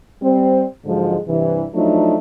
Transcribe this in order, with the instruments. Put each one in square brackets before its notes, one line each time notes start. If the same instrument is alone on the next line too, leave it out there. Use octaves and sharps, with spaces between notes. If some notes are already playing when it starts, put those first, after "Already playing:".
[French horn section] G3 C4
G#2 D3 F3 F#3 G#3
G2 C3 E3
F3 F#3 A3 D4 D#4